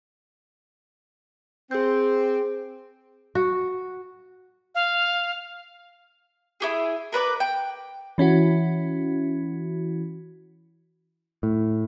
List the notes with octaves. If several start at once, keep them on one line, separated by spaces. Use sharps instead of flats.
C4 G#4 G6
F#4
F5
E4 G4 G#4
A#4 B4 C#5 D5
G5
E3 C#4 E4 F#4
A2